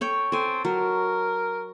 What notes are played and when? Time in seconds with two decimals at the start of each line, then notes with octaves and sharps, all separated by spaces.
0.01 A4 C#5 G5
0.32 C4 A4 G#5
0.65 F#3 A#4